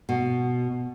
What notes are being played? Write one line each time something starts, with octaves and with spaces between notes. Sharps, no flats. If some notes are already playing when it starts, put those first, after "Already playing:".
B2